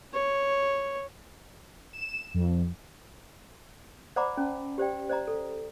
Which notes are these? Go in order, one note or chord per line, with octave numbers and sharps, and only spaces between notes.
C#5
E7
F2
C5 D5 F#5 A#5 B5 D6
C#4 A5
G4 C5 D5 G5
C5 D5 D#5 A#5
A4